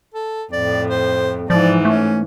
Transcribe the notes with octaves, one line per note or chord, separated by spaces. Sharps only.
A4
F2 A2 D5
C5
G#2 E3 F3 D5
A3 C#4